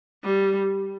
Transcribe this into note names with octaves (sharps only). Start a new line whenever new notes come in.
G3